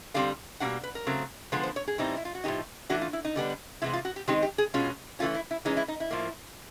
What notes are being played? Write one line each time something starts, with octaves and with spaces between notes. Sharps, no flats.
D3 G3 C4 F5
B2 G3 A#3 D4 F#5
B4
A#4
C#3 F#3 A3 C4
D3 F3 G#3 B3 B4
C5
C#5
G#4
A2 E3 G3 C4 D#4
E4
F4
F#4
A2 F3 A#3 D#4 G4
E3 A3 D4 F#4
F4
E4
D#4
D3 G3 B3 D4
C3 E3 G#3 B3 E4
F4
F#4
G4
D#3 G#3 C4 D#4 G4
G4
G#4
B2 G#3 C#4 F4
E3 A3 C#4 F4
E4
E4
E3 G#3 C#4 D#4
E4
D#4
E4
A2 F3 A#3